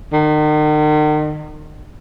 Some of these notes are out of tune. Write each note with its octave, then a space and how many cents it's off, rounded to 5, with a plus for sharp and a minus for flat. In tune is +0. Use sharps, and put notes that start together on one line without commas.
D#3 -40